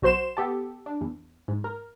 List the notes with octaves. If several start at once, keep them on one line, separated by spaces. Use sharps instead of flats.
B1 F#4 C5 C6 E7
B3 G4 A4
D4
E2
G#2
A#4